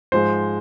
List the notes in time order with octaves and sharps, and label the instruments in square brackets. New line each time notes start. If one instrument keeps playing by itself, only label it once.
[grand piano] G#2 F3 G#3 C5